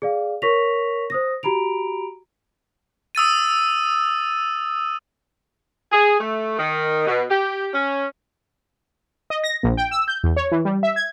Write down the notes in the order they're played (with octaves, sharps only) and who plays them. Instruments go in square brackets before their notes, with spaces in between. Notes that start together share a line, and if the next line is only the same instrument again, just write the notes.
[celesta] G#4 D5 F5
A#4 C#5 C#6 A#6 B6 F7
C5 D#6 A#6
F#4 G4 A#5 B5 D7 F7
[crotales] D#6 E6 A6 D#7
[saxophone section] G#4
A3
D#3
B2
G4
C#4
[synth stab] D#5
A#6
A#1
G5
E6
G6
E2
C#5
E3
G3
E5
G#6